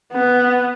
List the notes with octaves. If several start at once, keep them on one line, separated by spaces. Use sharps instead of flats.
B3